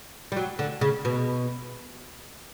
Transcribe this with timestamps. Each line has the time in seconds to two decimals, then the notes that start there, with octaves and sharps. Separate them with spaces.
0.32 G3
0.36 F#3
0.59 D3
0.81 C#3
1.05 B2